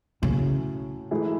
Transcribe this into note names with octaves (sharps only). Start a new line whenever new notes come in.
A2 C#3 F#3 C#4
G#2 E3 A3 E4 G#4